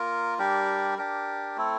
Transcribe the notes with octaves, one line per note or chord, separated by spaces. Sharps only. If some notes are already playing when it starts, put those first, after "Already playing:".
Already playing: A#3 F4 A#4
G3 D4 G4 A#4
D4 G4 A#4
A3 C4 E4 A4